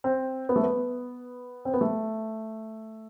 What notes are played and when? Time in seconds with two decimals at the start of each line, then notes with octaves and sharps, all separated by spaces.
0.04 C4
0.49 B3
0.56 A3
0.63 B3
1.65 C4
1.74 B3
1.81 A3